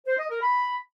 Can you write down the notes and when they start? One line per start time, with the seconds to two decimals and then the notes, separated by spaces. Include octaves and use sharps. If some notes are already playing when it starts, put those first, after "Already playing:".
0.06 C5
0.18 D#5
0.30 A#4
0.42 B5